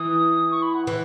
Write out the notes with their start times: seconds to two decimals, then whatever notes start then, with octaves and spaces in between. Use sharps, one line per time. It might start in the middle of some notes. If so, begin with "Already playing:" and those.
Already playing: E3 D#6
0.51 C#6
0.63 B5
0.74 F#5
0.87 E3 F#5